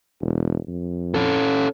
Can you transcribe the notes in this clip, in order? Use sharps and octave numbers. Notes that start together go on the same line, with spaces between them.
E1
F2
C#4 A4